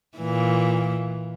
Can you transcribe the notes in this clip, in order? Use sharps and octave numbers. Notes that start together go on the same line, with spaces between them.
A#2 E3